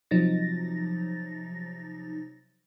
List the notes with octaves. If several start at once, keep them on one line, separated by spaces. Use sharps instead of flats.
C3 F3 F#3 D#4 A6 A#6